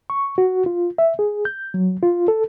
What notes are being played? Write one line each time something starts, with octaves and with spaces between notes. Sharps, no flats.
C#6
F#4
F4
E5
G#4
G6
F#3
F4
A4